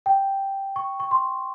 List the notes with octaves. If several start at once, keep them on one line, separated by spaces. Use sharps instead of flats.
G5
C#6
C#6
C6